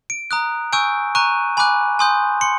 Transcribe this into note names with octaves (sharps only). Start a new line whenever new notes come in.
D7
A#5 D#6 F#6
G#5 C#6 E6 G6 D7
A#5 C#6 F#6 D#7
G#5 B5 D6 F#6
G#5 C6 D#6 G6
C6 C#7